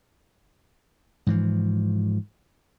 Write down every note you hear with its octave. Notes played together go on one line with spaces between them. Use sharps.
G#2 E3 F3